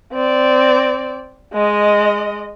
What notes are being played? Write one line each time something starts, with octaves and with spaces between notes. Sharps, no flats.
C4 D5
G#3 D#5